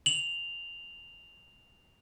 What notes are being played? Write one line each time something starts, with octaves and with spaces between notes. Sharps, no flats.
F7 F#7